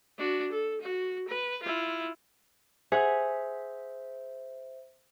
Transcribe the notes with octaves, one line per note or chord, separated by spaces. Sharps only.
D4 F#4
A4
F#4
B4
E4 F4
G#4 C5 E5 F#5